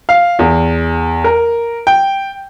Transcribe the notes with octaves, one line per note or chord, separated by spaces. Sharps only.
F5
E2
A#4
G5